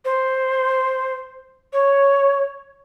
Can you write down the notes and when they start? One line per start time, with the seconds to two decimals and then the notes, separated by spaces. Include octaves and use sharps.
0.04 C5
1.72 C#5